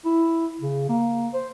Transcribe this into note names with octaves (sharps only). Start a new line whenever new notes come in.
E4
C#3
A#3
C5